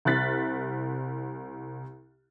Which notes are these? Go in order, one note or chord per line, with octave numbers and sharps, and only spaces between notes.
C2 F6 F#6 A6 B6